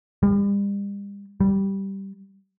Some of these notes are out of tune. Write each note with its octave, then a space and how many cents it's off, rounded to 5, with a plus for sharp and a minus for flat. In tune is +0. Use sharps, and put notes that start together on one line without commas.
G3 +40
G3 -10